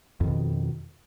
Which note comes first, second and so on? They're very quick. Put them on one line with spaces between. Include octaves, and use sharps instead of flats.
F2 D#3 B2